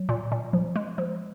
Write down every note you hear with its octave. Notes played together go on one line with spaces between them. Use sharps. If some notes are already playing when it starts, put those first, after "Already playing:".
Already playing: F#3
A#2
A#2
F3
G#3
F3